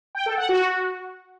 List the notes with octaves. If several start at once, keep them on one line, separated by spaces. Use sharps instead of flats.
G5
A4
F#5
F#4